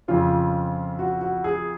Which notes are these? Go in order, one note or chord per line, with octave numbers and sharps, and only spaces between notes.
F2 C#3 F3 F4
F#4
F#4
G#4